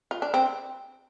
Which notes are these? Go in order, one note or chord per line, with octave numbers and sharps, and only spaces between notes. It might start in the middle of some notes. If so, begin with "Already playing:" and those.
F4
D4
C4